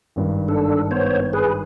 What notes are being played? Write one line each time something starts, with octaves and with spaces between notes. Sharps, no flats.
G#1 G2
D4 A4
B3 C5 C#5
G#4 B4